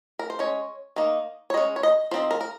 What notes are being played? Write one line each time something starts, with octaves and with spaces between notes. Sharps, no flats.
A#4
C5
G#3 C#4 C#5
D#3 A#3 D#4
C#5
G#3 C#4 D#5
C#5
D#5
F3 C4 D#4 C5
A#4
A#4